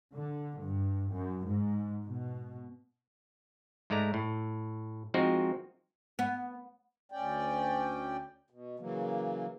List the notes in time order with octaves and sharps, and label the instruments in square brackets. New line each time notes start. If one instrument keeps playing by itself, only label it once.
[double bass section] D3
G2
F#2
G#2
B2
[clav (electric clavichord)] G#2 G#3 A3 D5 A#5
A2
F3 G#3 C4 D#4 F#4
[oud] B3
[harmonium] D2 C#4 D5 G5
B2
C#3 E3 F#3 A#3